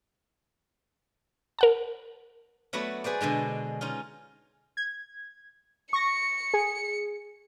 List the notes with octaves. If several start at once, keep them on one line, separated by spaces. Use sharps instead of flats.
A#4 F#5 A5
F#3 A3 B3 F#4 B4 D5
G#4 B4 C5 D5
B2 D3 G#3 D4
C#4 D#4 F4
G#6
C#6 A#6 C#7
G#4